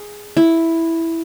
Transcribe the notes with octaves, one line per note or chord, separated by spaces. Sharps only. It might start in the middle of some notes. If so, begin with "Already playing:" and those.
Already playing: G#4
E4